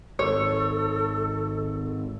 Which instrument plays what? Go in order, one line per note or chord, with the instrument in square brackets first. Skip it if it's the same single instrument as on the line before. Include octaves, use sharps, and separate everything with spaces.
[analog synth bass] G#1 [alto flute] A4 [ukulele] C#5